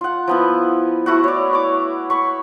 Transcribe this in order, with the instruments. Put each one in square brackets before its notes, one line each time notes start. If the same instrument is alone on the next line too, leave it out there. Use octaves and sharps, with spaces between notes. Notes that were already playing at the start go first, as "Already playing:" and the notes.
[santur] F4 F#5
F3 B3 E4
A3 E4 F#4 F#5
C#5 D5
C#5 D6
B5 C#6